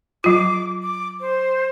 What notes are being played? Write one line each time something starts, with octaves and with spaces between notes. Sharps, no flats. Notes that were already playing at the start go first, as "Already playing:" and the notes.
F#3 F4 D6
D6
C5